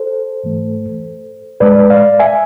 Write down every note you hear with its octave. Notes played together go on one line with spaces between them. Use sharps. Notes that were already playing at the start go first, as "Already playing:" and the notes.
Already playing: A4 C5
G#2 E3 A3
A2 G#3 B4 D5
D5 F5
E5 G#5